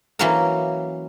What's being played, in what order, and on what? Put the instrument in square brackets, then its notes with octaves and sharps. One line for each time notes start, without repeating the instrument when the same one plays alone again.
[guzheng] E3 F#3 A#3 C#4 F#4 A#4